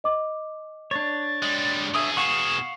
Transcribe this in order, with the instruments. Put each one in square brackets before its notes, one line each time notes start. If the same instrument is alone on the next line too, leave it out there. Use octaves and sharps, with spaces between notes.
[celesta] D#5 D6
[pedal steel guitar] D4 C#5 [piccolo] A6
[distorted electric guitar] G3 G#3
[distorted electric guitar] B2 G#4 [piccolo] E5 [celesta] D#6 E6
[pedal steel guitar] F5 F#5 C#6 [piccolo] E7